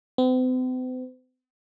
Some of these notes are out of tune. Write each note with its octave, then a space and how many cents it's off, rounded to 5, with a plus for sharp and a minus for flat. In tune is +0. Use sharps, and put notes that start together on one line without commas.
C4 -45